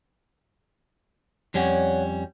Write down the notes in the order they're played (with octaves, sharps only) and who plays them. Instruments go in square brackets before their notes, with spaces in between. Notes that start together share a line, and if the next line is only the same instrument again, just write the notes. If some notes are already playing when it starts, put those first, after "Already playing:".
[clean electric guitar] F2 G3 C#4 [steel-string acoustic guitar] C#5 D5 F#5